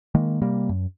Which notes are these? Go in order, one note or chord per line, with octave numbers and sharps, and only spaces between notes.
D#3 G#3 A#3
C3 G3 A#3
F#2